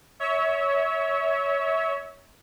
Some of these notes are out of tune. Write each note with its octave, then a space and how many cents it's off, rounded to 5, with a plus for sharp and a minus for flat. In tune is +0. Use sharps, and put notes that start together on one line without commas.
C#5 +15 E5 -25